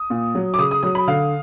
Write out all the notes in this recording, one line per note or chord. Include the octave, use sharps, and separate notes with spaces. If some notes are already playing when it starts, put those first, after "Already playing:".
Already playing: D#6
A#2
F#3
D6
C#3 D#6
D#6
F#3 D#6
B5
D3 F5